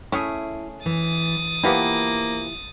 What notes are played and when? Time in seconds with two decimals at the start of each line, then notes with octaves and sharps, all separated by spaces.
0.12 A3 C#4 E4 G#4
0.86 E3 D#6 A6
1.64 E3 F3 A#3 B3 E4 F4 G4